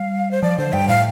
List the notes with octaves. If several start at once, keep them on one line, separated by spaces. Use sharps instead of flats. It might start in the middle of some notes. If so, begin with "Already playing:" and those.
Already playing: G3 F5
C5
F3 D5
D3 C5
G2 G5
A2 F5